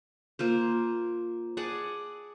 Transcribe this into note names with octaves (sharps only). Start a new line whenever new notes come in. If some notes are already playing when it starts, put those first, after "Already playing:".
A#3 F4 C5
G#4 D5 F#5 A5